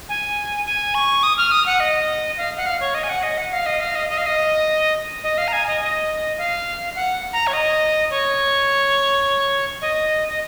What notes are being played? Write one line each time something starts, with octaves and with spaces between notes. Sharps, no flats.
G#5
G#5
C#6
D#6
F6
D#6
F#5
D#5
F5
F#5
F5
C#5
D#5
G#5
F#5
D#5
F#5
F5
D#5
F5
D#5
D#5
F5
D#5
D#5
F5
A#5
G#5
D#5
D#5
F5
F#5
A#5
C#5
D#5
C#5
D#5
D#5